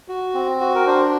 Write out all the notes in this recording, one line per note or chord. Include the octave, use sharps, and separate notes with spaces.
F#4
C4
F#4
A#4
D4 C5